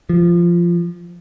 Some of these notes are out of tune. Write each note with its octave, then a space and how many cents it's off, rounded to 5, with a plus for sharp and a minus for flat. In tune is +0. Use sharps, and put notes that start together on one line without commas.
F3 -15